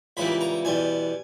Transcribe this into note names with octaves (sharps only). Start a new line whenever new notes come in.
C#2 C#3 E3 G3 A#3 B5
A#5
E2 B2 G3 G#5